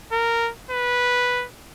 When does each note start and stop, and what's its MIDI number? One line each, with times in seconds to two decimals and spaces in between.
0.12 0.50 70
0.71 1.45 71